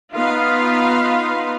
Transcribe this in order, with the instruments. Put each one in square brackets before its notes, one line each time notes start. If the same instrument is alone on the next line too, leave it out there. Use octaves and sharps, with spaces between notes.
[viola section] B3 D#4 F4 B4 F5